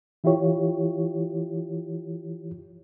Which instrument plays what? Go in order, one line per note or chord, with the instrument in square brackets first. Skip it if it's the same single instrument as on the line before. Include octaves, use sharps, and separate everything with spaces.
[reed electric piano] E3 E4 F4 G4 C#5